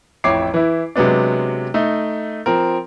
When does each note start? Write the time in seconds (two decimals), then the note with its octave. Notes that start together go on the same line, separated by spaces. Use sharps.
0.24 A1 F2 E4 C#5 D6 C7
0.54 E3 E4
0.96 C3 F#3 G#3 B3 D4
1.74 A3 D#4
2.46 F3 C4 A#4